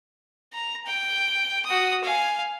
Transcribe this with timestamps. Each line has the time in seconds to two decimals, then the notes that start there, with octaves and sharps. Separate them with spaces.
0.53 A#5
0.86 G5
1.66 F#4 D#6
2.04 F5 G#5